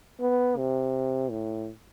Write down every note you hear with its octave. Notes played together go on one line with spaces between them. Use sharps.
B3
C3
A2